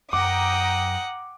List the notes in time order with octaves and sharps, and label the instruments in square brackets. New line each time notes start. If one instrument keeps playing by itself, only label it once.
[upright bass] F#2 [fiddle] F#5 [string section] G5 A#5 D#6 [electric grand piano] D6